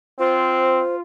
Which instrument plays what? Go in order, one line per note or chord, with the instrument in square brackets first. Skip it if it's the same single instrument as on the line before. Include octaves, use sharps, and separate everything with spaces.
[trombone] C4 [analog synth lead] F4 [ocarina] C5